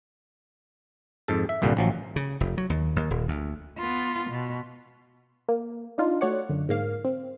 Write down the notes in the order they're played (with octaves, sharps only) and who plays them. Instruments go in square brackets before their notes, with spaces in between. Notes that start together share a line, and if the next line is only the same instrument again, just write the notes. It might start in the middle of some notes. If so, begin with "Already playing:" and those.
[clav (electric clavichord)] F2 G#2 A4
E5
C2 G2 A#2 D3
A1 F3 F#3
[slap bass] C#3
F1
F#3
D#2
D#2
D#1
D2
[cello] B3 F4
B2
[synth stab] A#3
D4 D#4 F4
A3 F#4 C#5 D5 F#5
F#2 D3
G#2 A#3 F5
C4